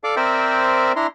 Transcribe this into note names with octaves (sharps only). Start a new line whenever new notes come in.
A4 D5 F5 D6
C4 A#4 C5 D5 E5 G5
D4 E4 A#5 C6